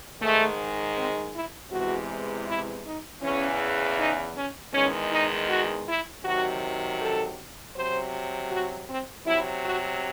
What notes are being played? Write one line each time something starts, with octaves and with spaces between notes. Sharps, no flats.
G#2 D#3 G#3 A3
C4
E4
E2 C3 E3 G#3 F#4
E4
D#4
E2 C#3 E3 C#4
D#4
C#4
E2 D#3 G#3 C#4
D#4
F#4
E4
C3 D#3 F#3 F#4
A4
C3 F#3 C5
F#4
C4
C3 F#3 E4
F#4